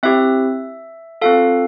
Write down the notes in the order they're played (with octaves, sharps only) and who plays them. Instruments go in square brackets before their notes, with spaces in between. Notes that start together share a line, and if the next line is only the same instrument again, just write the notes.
[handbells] C4 E4 G4 E5
C4 F4 A4 F5